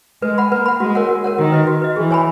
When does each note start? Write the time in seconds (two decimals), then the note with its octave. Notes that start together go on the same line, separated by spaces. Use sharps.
0.22 G#3 B4
0.38 F#5 B5
0.51 A#3 B4
0.66 F#5 B5
0.80 G#3 F#4
0.95 A#4 C#5 F#5
1.09 F#4
1.24 A#4 C#5 F#5
1.38 D#3 F#4
1.52 B4 D#5
1.67 F#4
1.82 B4 D#5
1.96 E3 G#4
2.11 C#5 G#5 B5